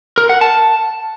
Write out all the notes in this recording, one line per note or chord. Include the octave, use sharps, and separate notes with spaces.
A#4
F#5
A5